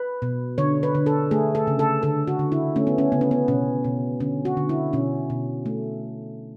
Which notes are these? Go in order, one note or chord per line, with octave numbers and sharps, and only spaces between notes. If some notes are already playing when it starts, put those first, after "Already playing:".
Already playing: B4
B2
D3 C#5
B4
D3
A4
A3 G#4
A4
C#3
A4
D3 A4
F#4
D3
E4
A3 C#4
B3
C#4
C#3 B3
C#4
B3
B2 C#4
B2
D3 C#4
F#4
D3
E4
B2 C#4
B2
A3